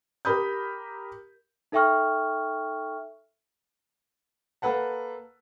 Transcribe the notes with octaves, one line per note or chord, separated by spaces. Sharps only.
G4 A#4 B5 D#6 G6
D#4 A4 E5 G5 C#6 F6
A#3 A4 B4 F#5 A5